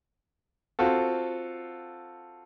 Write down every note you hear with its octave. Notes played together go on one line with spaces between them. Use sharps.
C4 F4 F#4 A4